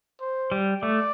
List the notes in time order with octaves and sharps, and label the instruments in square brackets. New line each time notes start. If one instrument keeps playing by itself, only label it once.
[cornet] C5
[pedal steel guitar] G3
[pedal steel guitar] A3 [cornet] D5